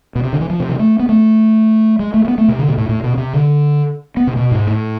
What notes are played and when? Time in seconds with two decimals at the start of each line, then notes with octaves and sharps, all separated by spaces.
0.15 B2
0.24 C3
0.33 D3
0.41 E3
0.50 F3
0.60 C3
0.69 E3
0.79 A3
1.00 B3
1.09 A3
1.99 G#3
2.14 A3
2.25 A3
2.28 B3
2.38 A3
2.48 C3
2.59 D3
2.68 B2
2.78 A2
2.89 A2
3.04 B2
3.17 C3
3.33 D3
4.17 B3
4.27 C3
4.37 B2
4.51 G#2
4.67 A2